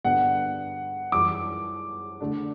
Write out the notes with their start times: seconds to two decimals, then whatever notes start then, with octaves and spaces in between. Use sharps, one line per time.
0.05 G2 D3 G3 B3 F#5
1.12 F#2 E3 G3 D6
2.20 D3 A3 D4